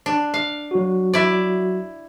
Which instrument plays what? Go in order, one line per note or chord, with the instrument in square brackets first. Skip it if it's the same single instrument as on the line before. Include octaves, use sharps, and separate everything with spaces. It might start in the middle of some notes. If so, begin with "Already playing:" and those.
[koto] D4
F5
[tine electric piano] F#3 F#4
[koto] E4 D5